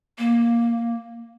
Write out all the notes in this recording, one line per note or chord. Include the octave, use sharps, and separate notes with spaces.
A#3